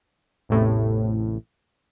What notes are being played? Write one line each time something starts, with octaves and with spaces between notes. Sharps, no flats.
A1 E2 A2 C3